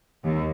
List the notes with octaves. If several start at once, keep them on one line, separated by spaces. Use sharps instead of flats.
D#2